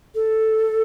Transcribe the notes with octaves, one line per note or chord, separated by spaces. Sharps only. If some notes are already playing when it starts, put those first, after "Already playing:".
A4